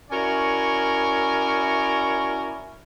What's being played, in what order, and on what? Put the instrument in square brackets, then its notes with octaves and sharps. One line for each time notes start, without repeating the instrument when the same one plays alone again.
[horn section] C#4 E4 F#4 A#4 C#5 D5